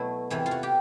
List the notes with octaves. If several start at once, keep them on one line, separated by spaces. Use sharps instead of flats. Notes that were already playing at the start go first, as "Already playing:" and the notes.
Already playing: B2 F#3 A3 E4
E2 C3 E3 E4
F4
F#4
G4